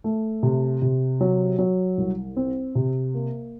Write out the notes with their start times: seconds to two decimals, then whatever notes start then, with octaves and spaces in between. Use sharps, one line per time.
0.04 A3
0.43 C3
0.82 C3
1.21 F#3
1.59 F#3
1.98 C2
2.37 C4
2.75 C3
3.14 A#3